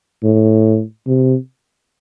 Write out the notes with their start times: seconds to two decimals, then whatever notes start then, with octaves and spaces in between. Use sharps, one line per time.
0.23 A2
1.07 C3